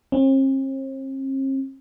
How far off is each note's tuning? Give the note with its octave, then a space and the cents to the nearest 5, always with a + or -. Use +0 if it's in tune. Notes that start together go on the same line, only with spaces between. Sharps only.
C4 +45